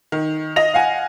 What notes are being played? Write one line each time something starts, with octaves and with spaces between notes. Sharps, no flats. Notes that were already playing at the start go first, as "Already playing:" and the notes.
D#3
D#5 A#6 F7
F5 F#5 G#5